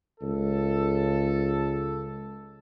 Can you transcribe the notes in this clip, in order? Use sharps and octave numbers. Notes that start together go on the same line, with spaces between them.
C#2 A4